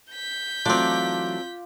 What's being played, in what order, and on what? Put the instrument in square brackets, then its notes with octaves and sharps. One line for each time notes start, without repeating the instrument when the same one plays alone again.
[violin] G6 B6
[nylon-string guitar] E3 F#3 A3 [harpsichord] C4 D4 [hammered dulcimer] F4 D6